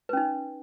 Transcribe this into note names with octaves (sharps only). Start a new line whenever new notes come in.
C#4 D#4 B4